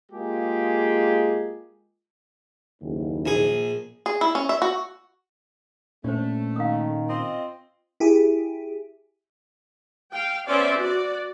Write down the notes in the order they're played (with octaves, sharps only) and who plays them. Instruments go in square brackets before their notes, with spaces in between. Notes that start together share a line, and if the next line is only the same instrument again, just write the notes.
[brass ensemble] G#3 A#3 F4 G4 G#4
F#1 D#2
[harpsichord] A#1 G#4
[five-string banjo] G#4
E4
C#4
E5
F#4
[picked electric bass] A#2 C#4 [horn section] A3 [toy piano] D4 C5
[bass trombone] D#3 [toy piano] F5 D#6
[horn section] C4 F4 D#5
[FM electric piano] E4 G4 G#4
[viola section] F5 G5
B3 C#4 C5 D5 E5
F#4 D5